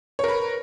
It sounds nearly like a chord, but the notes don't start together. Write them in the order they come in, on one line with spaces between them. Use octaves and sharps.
C#5 A#4 B4